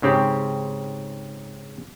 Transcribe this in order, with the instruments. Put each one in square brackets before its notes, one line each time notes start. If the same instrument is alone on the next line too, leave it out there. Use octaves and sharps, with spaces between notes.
[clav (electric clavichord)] G#2 C#3 C4 G4